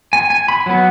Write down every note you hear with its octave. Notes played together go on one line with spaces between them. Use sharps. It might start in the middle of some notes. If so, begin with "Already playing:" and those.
G#5
G#5
B5
F#3 B3